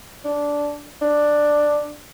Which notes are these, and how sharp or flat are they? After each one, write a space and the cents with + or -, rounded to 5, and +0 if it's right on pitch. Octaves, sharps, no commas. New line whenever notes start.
D4 -10
D4 +10